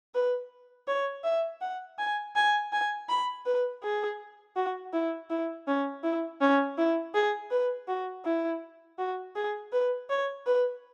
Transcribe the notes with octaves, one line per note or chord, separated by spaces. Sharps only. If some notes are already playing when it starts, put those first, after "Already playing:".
B4
C#5
E5
F#5
G#5
G#5
G#5
B5
B4
G#4
F#4
E4
E4
C#4
E4
C#4
E4
G#4
B4
F#4
E4
F#4
G#4
B4
C#5
B4